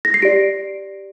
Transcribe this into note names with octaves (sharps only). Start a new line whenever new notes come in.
A#6
C7
G4 D5 D7